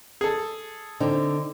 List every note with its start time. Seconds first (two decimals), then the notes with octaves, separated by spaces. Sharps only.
0.21 G#4 A4
1.00 D3 C4 D#4